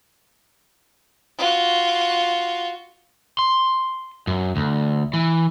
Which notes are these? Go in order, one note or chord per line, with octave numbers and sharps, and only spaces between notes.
F4 F#4
C6
F#2
D2
E3